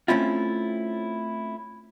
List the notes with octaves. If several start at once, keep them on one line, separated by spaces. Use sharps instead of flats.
A3 C4 C#4 E4 F4